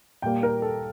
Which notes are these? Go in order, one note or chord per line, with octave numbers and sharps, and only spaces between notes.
A#2 G3 A#3 G5
A#4
A4